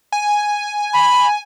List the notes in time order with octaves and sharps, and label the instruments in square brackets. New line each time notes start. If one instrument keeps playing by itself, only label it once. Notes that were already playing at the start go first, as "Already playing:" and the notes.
[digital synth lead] G#5
[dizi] B5